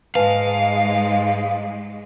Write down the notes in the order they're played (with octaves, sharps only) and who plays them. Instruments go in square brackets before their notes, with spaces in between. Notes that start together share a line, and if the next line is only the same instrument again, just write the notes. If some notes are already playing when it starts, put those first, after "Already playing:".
[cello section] G#2 G#3 [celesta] B4 G#5 A5 [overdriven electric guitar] F5